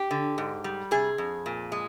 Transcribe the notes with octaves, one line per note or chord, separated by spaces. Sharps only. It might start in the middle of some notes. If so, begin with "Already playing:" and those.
Already playing: G4
D3
G#2
G3
C3 G#4
F2
A#2
G#3